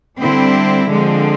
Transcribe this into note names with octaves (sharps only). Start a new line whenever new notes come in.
D3 G3 C4 E4
D3 F3 G#3 C4